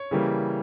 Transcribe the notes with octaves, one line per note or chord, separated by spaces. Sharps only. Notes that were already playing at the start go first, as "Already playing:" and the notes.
Already playing: C#5
C#3 E3 G3 A#3